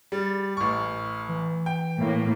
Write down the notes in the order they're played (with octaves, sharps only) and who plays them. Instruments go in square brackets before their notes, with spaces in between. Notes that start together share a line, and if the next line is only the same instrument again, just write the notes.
[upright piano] G3 [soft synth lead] A6
[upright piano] A1 C#6 [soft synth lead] F6
[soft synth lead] E3
[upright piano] G5
[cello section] A2 A#3